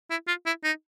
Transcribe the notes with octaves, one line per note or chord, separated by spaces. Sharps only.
E4
F4
E4
D#4